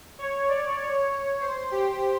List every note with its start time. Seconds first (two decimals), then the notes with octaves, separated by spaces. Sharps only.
0.19 C#5
0.49 D5
0.80 C#5
1.41 C5
1.71 G4